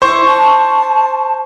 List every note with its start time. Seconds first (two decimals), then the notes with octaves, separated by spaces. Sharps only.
0.02 E4 C5 C#6
0.25 A5